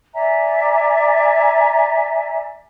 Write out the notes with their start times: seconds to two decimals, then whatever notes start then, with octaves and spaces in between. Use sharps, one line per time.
0.13 D5 E5 G#5 A#5